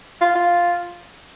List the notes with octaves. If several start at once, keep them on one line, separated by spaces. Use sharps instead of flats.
F4
F4